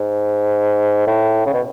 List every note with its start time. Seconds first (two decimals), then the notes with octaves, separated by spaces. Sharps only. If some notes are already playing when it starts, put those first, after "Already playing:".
Already playing: G#2
1.07 A2
1.46 C#3
1.53 B2